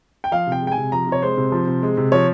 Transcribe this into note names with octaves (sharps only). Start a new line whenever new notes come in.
G5
F3 F5
C3
G5
G#3
G5
G#5
C3
F3 A#5
C3
C#5
G#3 C5
C3
F3
C3
G#3
C3
F3 C#5